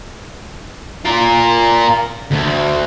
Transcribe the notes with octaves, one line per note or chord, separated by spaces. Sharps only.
F4 A#4
D2